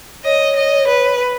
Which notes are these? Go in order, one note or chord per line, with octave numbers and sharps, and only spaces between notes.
C#5 D#5
D#5
B4